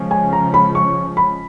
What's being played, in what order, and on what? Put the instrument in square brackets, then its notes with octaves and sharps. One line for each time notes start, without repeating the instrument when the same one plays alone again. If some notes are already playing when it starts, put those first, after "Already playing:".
Already playing: [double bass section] C#3 F3 G#3 C#4
[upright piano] G#5
A#5
B5
C#6
B5